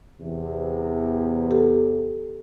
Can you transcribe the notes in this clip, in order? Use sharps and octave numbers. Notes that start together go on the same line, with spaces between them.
E2 C3
G4 A4